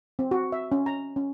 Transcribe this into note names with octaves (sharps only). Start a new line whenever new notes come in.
C4
F#4
E5
C#4
A#5
C#4